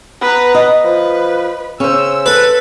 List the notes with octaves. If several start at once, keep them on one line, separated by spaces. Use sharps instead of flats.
B3 B4 A#5
D#5
F3 B4
C#3 C#4 C5 E6
A4 B4